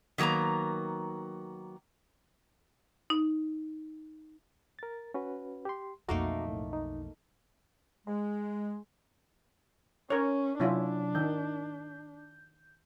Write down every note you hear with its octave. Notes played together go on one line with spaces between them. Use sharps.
D#3 F#3 A#3 B3 A#5
D#4
A#4 A6
C#4 F#4 B4
G4 C6
B1 F2 A3 A#3 D#4 F#4 A#5 D6
A2
D#4
G#3
C#4 A#4 C#5
C3 F#3 C#4 D4 E4 F4
D#3 G6